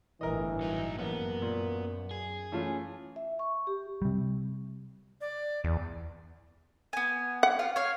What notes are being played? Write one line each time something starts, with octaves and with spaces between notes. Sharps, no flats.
G1 A2 E3 A#4 D#5
F#3 D#4
A1 F#2 A#3 B3
A#2
G#4
E3 A3 C#4 F4
E5
C#6
G4
C3 G3
D5
E2
B3 G#5
F#5
F4 F5
C#5 F5